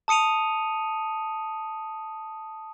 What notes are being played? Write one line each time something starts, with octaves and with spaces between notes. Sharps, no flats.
A5 D#6 C#7 D#7 F7